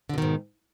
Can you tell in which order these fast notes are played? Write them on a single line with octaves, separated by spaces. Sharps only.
D3 B2 D#3 G#2